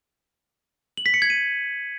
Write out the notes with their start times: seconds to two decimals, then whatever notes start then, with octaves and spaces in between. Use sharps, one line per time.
0.97 F#7
1.06 B6
1.14 C#7
1.22 G#6
1.30 D#7